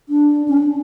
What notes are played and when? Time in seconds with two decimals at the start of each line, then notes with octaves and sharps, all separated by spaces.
0.09 D4
0.48 C#4
0.57 D4